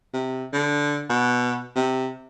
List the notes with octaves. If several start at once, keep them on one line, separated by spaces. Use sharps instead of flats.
C3
D3
B2
C3